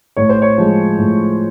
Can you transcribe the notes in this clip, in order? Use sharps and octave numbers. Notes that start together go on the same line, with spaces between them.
A2 C#5
C5
C#5
F3 G#3
A2